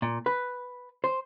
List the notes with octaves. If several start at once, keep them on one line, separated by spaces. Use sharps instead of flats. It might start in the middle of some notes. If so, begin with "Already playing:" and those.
A#2
B4
C5